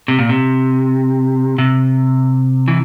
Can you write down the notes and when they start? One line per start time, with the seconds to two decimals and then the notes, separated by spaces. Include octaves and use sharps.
0.08 C3
0.19 A#2
0.29 C3
1.58 C3
2.68 E3